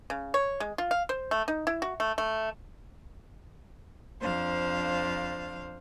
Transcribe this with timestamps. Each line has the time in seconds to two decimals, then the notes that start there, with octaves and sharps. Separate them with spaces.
0.10 C#3
0.34 C#5
0.60 G#3
0.78 F4
0.91 F5
1.09 C5
1.31 A3
1.48 D#4
1.67 E4
1.82 F#4
2.00 A3
2.18 A3
4.21 F2 D4 C5 F5